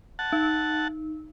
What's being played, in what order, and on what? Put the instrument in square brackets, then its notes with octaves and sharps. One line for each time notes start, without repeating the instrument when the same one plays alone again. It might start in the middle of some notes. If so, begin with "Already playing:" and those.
[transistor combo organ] F#5 A5
[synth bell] D#4